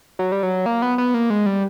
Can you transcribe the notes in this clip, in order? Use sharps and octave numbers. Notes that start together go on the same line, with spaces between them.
F#3
G3
F#3
A#3
B3
B3
A#3
G#3
G3